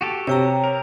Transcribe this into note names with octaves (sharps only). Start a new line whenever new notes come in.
F#4 G4 A4
C3 C#5 G5 A#5
A#4